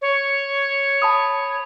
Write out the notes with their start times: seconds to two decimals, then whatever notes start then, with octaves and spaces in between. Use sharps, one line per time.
0.01 C#5
1.02 A5 B5 D#6